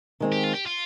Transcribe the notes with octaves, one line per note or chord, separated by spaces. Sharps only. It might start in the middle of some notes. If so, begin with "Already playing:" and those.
D#3 G#3 C4
G4
F4
G4
F4